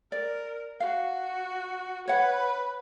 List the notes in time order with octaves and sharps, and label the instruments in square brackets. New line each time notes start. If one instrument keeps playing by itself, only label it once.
[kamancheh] A#4 [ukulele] D5
[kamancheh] F#4 [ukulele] F5
[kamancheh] B4 [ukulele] C#5 F#5